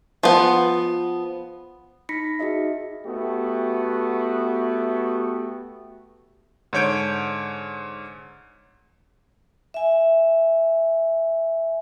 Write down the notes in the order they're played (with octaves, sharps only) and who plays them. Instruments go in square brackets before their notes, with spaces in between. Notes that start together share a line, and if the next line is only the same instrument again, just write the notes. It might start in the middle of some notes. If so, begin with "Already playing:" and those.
[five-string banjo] F3 B3
[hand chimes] D#4 B5 A#6 B6 C#7
D#4 F#4 G#4 D#5 E5
[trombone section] A3 B3 F#4 G4
[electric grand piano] G#2 D3 C#5 G6 D7
[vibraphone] E5 G#5